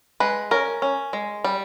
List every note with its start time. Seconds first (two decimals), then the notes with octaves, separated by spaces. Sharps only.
0.20 G#3 B4
0.51 C#4 A#4
0.82 C#4
1.13 G#3
1.44 G3